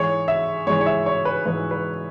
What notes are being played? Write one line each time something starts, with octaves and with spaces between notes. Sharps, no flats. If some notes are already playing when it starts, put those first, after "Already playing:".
Already playing: G#2 E3 G#3 C#5
E5
G#2 E3 G#3 C#5
C#5
E5
C#5
B4
G#2 E3 G#3 B4
B4